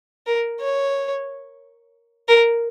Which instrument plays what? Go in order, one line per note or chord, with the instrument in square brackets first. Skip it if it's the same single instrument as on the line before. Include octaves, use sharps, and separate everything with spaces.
[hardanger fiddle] A#4
C#5
A#4